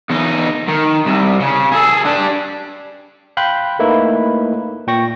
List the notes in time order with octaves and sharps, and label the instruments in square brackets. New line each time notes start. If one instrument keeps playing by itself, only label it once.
[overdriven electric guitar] E2 D#4
D#3
C2 C3
C#3
G#4 A4
D4 G4
[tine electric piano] F5 G5 B5 C6 F#6 G6
A3 A#3 D#4 E4 B4
A#2 G5 C#6 A#6